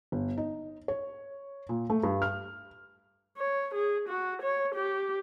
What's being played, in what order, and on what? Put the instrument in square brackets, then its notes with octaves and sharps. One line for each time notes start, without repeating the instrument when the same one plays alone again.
[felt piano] G1
D#4
C#5
A#2
A3
G2
F6
[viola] C#5
G#4
F#4
C#5
G4